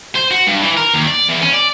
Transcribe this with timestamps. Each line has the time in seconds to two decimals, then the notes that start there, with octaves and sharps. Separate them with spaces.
0.15 C5
0.31 F#4
0.47 G2
0.62 E3
0.77 A#4
0.94 D#2
1.07 D5
1.29 E2
1.42 C#4
1.53 D5